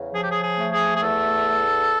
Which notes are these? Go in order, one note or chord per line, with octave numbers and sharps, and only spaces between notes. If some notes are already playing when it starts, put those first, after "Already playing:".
Already playing: E2 C#3
F3 G#4
G4
G#4
G#4
A3
G#4
G#4
E2 A4